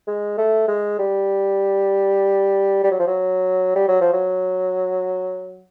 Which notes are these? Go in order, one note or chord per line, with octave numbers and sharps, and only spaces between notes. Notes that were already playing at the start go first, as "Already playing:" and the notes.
G#3
A3
G#3
G3
G3
F#3
F3
F#3
G3
F#3
F3
F#3